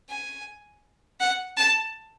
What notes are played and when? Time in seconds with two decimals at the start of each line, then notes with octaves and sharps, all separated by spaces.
0.09 G#5
1.20 F#5
1.57 A5